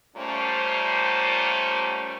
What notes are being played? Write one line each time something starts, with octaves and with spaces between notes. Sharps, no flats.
A#2 G3 A3 C#4 C5